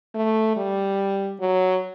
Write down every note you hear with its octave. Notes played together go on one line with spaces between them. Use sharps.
A3
G3
F#3